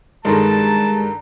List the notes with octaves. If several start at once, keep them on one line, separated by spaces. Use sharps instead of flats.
G2 D#3 G#3 A4 A5 A#5